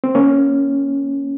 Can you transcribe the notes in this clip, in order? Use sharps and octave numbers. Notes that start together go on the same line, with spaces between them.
C4
A#3 C#4